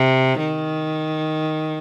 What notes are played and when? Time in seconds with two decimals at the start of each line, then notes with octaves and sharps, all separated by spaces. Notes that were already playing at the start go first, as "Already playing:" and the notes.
Already playing: C3
0.39 D#3